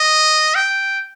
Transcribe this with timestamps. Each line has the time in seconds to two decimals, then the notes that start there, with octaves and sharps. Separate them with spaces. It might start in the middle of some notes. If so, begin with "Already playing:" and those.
Already playing: D#5
0.55 G5